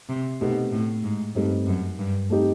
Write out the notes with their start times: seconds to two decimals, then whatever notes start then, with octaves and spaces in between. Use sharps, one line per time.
0.09 C3
0.41 B2 A3 C4 D#4 G4
0.71 A2
1.04 G#2
1.35 G2 A3 C4 D#4 G4
1.67 F#2
1.99 G2
2.30 A3 C4 D#4 G4